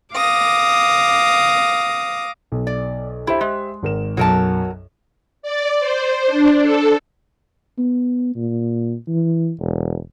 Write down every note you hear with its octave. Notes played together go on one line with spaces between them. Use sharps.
F5 D6 D#6 A#6
B1
D5
E4 G4 C5 E5
G#3
G#1 A#4 E7
B1 F#2 F#3 A#4 A5
D5
C5
D4
A4
B3
A#2
E3
E1